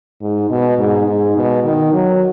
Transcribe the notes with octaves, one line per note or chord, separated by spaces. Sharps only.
G#2
B2
G#2
G#2
B2
D#3
F#3